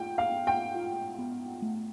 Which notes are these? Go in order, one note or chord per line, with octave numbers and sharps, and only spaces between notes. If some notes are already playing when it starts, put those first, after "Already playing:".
Already playing: F4 G5
F5
B3
G5
F4
B3
A3